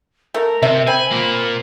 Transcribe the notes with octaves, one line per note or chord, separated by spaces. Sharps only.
A3 A#4
C3 E5
C4 G#5 B5
A#2 A#3